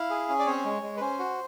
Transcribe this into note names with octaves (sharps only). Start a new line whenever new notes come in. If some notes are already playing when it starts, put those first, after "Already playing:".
Already playing: E4 F5
G#4
C#4
D5
C4 C#5
G#3
G#3
B4
C#4 C5
F#4